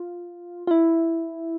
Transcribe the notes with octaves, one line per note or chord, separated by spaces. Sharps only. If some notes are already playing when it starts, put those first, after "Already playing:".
Already playing: F4
F4
E4